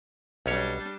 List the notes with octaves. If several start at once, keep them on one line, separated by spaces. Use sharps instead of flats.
B1 G3 C#4 D4 C#5